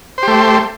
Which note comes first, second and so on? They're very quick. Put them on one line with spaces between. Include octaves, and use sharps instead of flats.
C5 G4 A3